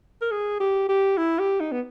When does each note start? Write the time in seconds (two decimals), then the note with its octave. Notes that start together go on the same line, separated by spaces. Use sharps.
0.21 A#4
0.31 G#4
0.60 G4
0.88 G4
1.17 E4
1.39 G4
1.60 D#4
1.72 B3